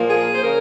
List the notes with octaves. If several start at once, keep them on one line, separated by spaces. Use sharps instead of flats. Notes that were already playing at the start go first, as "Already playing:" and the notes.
Already playing: A#2 F3 A#3
G#4
C5
C#3 A#4